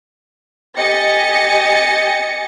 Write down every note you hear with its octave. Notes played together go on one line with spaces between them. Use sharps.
G4 D#5 G#5 A6 A#6 C#7